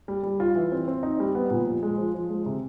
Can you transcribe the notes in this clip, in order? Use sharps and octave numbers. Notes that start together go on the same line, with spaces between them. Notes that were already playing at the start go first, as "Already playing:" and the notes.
G3
G3
F4
E3
C4
C4
D#4
G3
B3
A#2
F3
G#3
F3
F3
G#3
C3